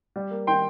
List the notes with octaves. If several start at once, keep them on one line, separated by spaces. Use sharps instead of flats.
G3
A#3
D#3 G5 C6